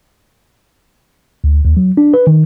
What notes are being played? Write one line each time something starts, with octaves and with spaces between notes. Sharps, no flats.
D2
D#2
F#3
D4
B4
D#3